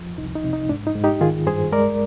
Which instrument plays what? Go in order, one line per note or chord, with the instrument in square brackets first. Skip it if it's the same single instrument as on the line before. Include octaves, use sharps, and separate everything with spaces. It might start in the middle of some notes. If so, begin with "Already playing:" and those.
Already playing: [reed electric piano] F2 F3
C2 D#4
D#4
C3
D#4
G#2 D4
D#4
G#2
D#4 G4
D#3 F4 G#4
G2 G#4 C5
G#3 A#4 D5